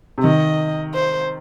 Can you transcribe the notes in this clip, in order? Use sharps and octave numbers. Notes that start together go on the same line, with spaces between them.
C3
D#3 D#5
C5